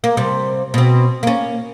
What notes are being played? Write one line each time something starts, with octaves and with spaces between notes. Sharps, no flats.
A#3
C3 G3
B2 C4
A#3 C#4